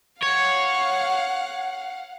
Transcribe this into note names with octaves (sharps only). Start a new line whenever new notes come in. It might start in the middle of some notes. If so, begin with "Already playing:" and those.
C#5 F5 F#5